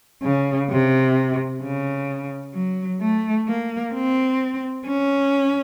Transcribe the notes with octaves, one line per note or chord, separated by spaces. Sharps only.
C#3
C3
C#3
F#3
A3
A#3
C4
C#4